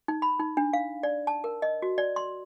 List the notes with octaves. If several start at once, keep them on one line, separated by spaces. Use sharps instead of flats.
D#4
B5
D#4
D4
F5
D5
A5
A#4
D#5
F#4
D5
C6